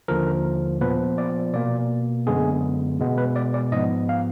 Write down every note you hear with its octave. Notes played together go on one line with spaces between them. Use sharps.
D#2 D3 F3 A#4
A#2 F3 B3 B4
D5
B2 A#3 D5
F#2 D3 G#3 B3 G#4
B2 G#3 B3
B4
D5
D5
G#2 F3 B3 D#5
F5